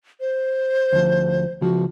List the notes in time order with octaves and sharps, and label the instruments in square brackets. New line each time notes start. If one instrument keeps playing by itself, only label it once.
[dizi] C5
[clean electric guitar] D2 F3
[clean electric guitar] C#2 F3 [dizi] F#4